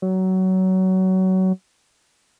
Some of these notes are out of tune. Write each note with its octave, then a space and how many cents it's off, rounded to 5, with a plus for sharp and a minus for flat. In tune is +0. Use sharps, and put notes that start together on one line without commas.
F#3 +20